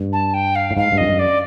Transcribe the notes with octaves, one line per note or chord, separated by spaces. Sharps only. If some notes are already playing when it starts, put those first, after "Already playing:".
Already playing: G2
A5
G5
F5
A2
G#2 F5
G2
F2 D#5
F#2
D5